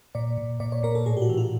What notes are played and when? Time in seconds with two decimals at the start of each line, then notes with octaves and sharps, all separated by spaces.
0.15 A#2 D5
0.37 A#2
0.60 A#2 D5
0.72 C#5
0.83 A#2 A#4
0.95 A4
1.06 A2 G#4
1.17 G4
1.22 F#4
1.29 E3
1.37 F4